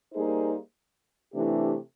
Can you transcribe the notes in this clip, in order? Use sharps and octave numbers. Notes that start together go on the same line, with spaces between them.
G3 A#3 D#4 G#4 C5
C3 E3 A3 D4 G4